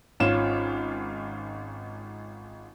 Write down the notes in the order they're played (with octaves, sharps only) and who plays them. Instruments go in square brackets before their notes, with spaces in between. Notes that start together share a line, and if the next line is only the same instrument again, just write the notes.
[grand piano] G#1 C#4 F4 E7